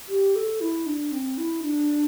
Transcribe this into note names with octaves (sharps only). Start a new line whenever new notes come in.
G4
A4
E4
D4
C4
E4
D4